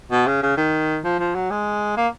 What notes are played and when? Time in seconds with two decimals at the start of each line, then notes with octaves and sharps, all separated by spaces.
0.11 B2
0.27 C#3
0.43 C#3
0.57 D#3
1.04 F3
1.20 F3
1.35 F#3
1.51 G#3
1.97 A#3